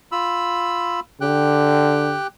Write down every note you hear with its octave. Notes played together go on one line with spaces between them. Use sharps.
F4 B5 E6
D3 G4 G5 F#6